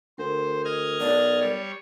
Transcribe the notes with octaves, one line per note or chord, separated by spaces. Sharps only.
D2 A#4 C5
D#5 F6 G#6
B1 D5
G3 C#5